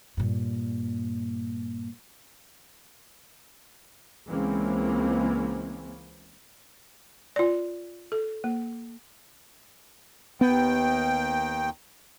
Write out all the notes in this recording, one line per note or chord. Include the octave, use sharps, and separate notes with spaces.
G2 A#2
C#2 E3 G#3 A#3 C4 C#4
F4 D5
A4
A#3
D#2 B3 G5